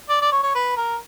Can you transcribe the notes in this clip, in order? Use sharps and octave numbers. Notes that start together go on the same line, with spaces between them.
D5
D5
C#5
C#5
B4
A#4